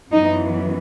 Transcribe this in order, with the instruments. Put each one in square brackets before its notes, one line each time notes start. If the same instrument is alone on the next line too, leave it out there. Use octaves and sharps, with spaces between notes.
[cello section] F#2 E3 B3 D#4